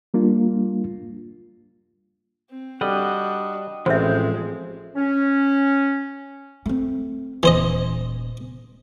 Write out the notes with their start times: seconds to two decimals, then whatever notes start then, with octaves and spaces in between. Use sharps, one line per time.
0.14 G3 A#3 D4 F4
2.50 C4
2.81 G3 D4 F#4 A4 D#5 F#5
3.86 A1 F3 G#3 C4 C5 E5 G6
4.95 C#4
6.66 A3 C4
7.43 D#1 E3 A#3 C5 D#5